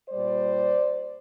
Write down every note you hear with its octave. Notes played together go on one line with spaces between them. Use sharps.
A#2 G3 C5 D5